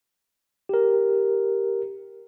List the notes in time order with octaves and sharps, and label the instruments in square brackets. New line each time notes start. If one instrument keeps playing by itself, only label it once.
[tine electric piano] G4 A#4